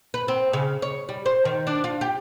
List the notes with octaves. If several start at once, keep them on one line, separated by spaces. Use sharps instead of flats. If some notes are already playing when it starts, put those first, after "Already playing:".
B4
C4
C#3
C#5
G3
C5
D#3
D4
F4
G4